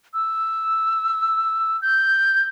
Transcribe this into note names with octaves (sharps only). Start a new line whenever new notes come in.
E6
G6